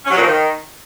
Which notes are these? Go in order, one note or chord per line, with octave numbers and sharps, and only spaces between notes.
C#4
F#3
A#2
F3
D#3